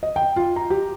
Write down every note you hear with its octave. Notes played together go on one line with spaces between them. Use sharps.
D#5
G5
F4
A#5
G4